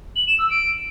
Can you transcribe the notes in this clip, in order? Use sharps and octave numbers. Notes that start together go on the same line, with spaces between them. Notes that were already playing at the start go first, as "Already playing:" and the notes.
F#7
E7
E6
D7